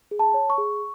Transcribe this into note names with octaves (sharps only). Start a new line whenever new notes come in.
G#4
A5
C#5
C#6
G#4